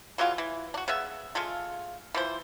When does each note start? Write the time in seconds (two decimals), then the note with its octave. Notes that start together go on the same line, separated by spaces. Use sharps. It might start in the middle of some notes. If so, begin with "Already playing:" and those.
0.18 E3 F#3 G#3 F4
0.38 E3
0.74 D4 F#4
0.88 C#3 B3 E5
1.35 C#3 G#3 A3 F4
2.14 E3 F3 C5